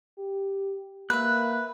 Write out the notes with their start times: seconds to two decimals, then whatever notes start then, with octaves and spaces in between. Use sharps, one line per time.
0.18 G4
1.10 A#3 B4 E5 F#6